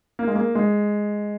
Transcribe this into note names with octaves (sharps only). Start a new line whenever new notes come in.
A#3
G#3
A#3
G#3